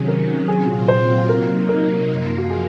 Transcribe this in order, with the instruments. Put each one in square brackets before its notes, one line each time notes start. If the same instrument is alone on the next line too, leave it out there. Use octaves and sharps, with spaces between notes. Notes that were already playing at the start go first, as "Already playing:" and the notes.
Already playing: [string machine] C3 D#3 F#3 C#4 [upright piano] G#4
[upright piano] A#4
[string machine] A#2 F#3 C4 F4 [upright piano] G#4
[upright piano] C5
[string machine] C3 F#3 A#3 D#4 [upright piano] A#4
[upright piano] A#4
[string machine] F#2 F3 A#3 F4
[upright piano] F#4
G#4